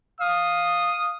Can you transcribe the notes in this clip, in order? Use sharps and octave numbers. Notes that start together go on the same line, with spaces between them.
F5 D#6